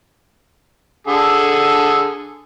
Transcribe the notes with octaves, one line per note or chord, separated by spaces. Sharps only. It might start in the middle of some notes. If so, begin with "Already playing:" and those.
D3 G#4 A4